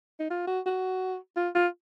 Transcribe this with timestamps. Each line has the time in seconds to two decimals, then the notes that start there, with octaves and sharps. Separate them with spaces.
0.20 D#4
0.30 F4
0.47 F#4
0.66 F#4
1.36 F4
1.55 F4